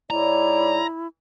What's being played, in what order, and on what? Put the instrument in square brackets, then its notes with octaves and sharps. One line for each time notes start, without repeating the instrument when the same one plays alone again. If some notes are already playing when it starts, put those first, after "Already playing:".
[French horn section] G#2 C#5 D5 [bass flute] E4 [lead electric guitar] A#5